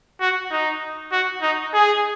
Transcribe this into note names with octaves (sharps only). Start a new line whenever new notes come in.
F#4
D#4
F#4
D#4
G#4